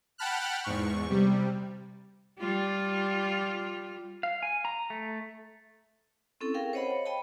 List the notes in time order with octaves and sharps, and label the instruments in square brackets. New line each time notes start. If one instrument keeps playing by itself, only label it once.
[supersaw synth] F#5 G5 A5 B5 F6 F#6
E2 G#2 C#6
C3 G3
[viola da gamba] G3 F4
[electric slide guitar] F5
G#5
A#5
A3
[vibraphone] C4 C#4 E4 A4
G#4 A#4 F5 G5
C5 C#5 D#5 F#5 B5
C#5
D#5 G5 A5 B5